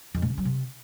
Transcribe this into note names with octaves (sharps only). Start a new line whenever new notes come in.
F2
A2
C#3
F#3
C3